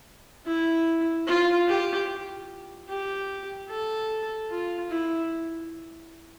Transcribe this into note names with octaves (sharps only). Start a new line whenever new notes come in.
E4
F4
G4
G4
A4
F4
E4